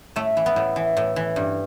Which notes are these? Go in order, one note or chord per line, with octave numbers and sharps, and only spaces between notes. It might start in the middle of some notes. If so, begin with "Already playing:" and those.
A2 A3
E3
B3
A2
E3
A2
E3
G2